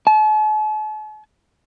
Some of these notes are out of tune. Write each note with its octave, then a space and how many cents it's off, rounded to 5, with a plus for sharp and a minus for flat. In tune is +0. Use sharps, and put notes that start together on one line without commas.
A5 -45